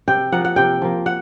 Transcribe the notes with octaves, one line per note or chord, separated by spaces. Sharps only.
C3 G5
F3 A#3 F#5
F#5
C3 G5
F3 A#3
F#5